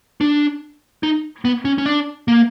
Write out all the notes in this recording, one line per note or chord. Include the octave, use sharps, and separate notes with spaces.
D4
D#4
B3
C#4
C#4
D4
A#3